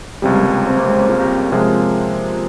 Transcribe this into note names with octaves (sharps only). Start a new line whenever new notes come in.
C#2 C3 G3 G#3
A#3
G#3
C#4
C4
A#3
G#3
A#3 C#4
F4 G#4
G4 A#4
C3 F3 G#3 F4 G#4